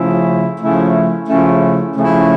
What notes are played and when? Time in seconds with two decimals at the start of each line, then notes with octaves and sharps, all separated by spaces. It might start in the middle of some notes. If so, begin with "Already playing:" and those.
Already playing: C#3 F3 A3 C#4 E4
0.60 C#3 F3 A3 C#4 E4
1.27 C#3 F3 A3 C#4 E4
1.96 C#3 F3 A3 C#4 E4